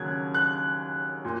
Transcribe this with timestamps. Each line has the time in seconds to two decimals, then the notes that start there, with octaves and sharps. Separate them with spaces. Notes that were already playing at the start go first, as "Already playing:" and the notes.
Already playing: D#2 C#3 F#3 F#6 G#6
0.34 F#6
1.25 A#2